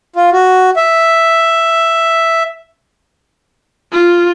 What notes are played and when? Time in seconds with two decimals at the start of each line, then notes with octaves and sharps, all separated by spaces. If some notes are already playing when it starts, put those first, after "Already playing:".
0.16 F4
0.32 F#4
0.76 E5
3.92 F4